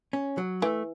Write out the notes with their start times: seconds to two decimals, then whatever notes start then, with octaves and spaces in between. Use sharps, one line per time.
0.13 C#4
0.38 F#3
0.62 E3 A3